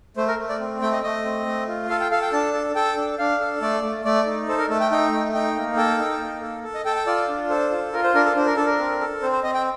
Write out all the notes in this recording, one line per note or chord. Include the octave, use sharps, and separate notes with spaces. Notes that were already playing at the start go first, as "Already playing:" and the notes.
A3 C5
A#4
A3
D5
C4
A3 G5
D#5
A3 D#5
C4
A3
F4
A4 F5
G5
A4 F5
G5
D4 A5
A4
A4 G5
D4
D4 F5
A4
A3 D5
A3
A3 D5
D#4
A4 C5
A#4
A3 A4
G5
D#4 G5
A3
D#4 G5
A#3
A4 G5
D#4
A#3
A4
A4
D#5
A4 G5
G5
F4 D5
D4
A4 C5
F4
F4 A#4
C5
D4 A#4
A4
D4 C5
A#4
D4 A4
A#4
C4
A4
C4 C5
C5
C4 D#5
G5